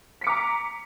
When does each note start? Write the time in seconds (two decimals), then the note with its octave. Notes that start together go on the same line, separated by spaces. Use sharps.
0.21 B6
0.24 C#7
0.27 D6
0.29 A#5